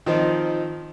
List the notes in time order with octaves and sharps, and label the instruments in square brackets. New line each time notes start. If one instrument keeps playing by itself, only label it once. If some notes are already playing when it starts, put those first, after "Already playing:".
[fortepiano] D#3 F3 C4 D#4